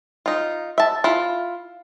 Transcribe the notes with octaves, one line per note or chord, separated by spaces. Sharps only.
D#4 F4
E5 A5
E4 F4